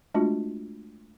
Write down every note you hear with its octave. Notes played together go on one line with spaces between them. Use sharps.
G#3 A3 D4 F4 F#4